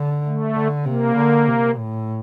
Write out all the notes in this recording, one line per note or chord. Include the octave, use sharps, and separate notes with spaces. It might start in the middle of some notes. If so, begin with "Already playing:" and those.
Already playing: D3
A3
D3
C3 A#3
D3
C3
A2